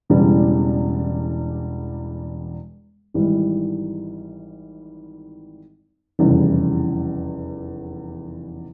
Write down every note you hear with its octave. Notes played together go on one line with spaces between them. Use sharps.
E1 E2 C#3 E3 G3
G#1 G#2 E3 G3
F1 E2 C#3 E3 G3